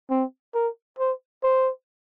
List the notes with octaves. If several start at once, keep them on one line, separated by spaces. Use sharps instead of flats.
C4
A#4
C5
C5